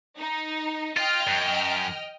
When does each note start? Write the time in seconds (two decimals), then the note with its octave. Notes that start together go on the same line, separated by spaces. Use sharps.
0.17 D#4
0.97 F4 D#5 G5 F6
1.27 F#2